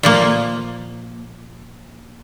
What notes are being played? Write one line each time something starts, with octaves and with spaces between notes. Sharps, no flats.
A#2 F3 A#3